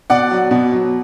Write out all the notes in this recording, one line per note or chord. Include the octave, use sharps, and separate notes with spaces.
B2 D5 F#5
F#3
B2
F#3